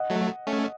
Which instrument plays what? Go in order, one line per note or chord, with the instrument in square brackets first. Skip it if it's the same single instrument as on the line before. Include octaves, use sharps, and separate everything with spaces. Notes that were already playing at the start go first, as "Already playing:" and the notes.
Already playing: [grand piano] D#5 F#5
[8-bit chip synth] F#3 A3
A3 C#4